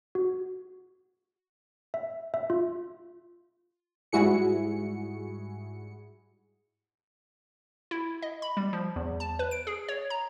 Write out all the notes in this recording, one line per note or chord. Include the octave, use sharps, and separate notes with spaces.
F#4
E5
E5
F4
G#2 G3 E4 F#4 G#4 C#7
E4
D#5
B5
G3
F3
E2
A5
B4
D7
G#4
C#5
A#5